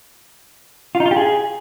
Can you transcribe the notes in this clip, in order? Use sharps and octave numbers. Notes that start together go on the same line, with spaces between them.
F4
D#4
F4
G4
G#4